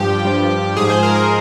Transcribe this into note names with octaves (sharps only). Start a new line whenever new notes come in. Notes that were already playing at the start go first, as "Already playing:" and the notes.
Already playing: G2 F3 G4
G2 F3
G#2 F3 G#4
C5
A#4
G#4